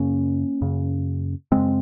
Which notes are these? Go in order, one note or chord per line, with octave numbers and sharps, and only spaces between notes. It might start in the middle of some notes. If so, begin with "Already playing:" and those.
Already playing: F#2 C#3 A#3 C#4
F#2 C#3
F#2 C#3 G#3 C4